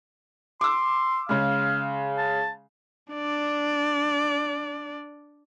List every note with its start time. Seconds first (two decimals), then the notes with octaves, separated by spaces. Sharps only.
0.61 C6 D6 E6
1.29 C#3 G#3 F5
2.18 A5
3.13 D4 D5